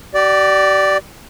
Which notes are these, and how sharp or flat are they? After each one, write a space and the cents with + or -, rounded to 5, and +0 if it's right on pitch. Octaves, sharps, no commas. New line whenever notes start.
G4 -40 D5 +0